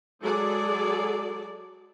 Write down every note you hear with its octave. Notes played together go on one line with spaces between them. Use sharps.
F#3 G#3 G#4 A4 D5